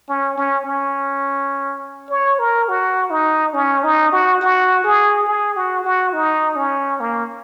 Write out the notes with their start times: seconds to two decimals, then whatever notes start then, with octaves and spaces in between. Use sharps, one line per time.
0.09 C#4
0.37 C#4
0.66 C#4
2.10 C#5
2.39 A#4
2.69 F#4
3.11 D#4
3.54 C#4
3.84 D#4
4.12 F#4
4.41 F#4
4.84 G#4
5.27 G#4
5.56 F#4
5.84 F#4
6.13 D#4
6.56 C#4
7.00 A#3